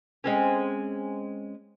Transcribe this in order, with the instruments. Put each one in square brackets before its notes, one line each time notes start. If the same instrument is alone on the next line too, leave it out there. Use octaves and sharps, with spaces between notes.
[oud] G#3 C4 C#4